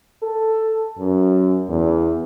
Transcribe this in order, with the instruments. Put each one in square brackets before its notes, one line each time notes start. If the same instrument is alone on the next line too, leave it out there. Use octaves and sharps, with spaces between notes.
[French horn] A4
F#2
E2